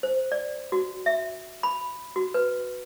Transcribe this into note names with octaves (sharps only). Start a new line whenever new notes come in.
C5
D5
F#4
E5
B5
F#4
B4